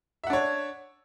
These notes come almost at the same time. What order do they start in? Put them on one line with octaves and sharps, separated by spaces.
E5 F#5 D4 C#5